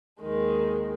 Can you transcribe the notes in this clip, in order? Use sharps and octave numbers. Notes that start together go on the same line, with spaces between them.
D#2 D#3 G#3